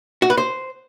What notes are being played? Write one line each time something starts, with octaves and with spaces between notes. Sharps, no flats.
F#4
B4
C5